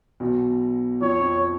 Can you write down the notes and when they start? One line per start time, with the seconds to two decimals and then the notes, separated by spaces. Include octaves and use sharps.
0.20 B1 B2
1.01 F2 F3 C#5
1.21 F2 F3